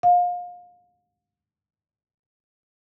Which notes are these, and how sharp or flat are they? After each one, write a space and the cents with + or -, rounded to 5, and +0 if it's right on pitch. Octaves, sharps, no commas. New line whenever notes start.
F5 +30